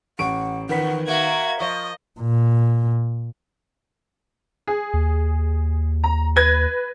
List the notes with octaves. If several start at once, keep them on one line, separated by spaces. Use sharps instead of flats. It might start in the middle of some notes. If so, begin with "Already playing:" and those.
A1 F#5 C#6 D7
E2 D#3 B4 F#5 B6
A#3 F#4 E5 G#6
F3 D#5 C#6
A#2
G#4
D#2
A#5
B4 G#6 A#6